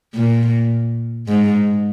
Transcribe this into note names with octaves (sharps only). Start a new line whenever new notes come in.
A#2
G#2